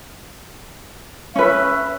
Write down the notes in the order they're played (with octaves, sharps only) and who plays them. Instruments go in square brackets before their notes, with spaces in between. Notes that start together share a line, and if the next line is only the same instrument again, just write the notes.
[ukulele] C#4 B4 [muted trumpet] E5